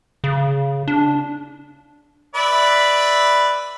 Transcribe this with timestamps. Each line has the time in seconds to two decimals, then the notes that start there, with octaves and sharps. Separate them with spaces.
0.24 C#3
0.88 D4
2.35 B4 D5 E5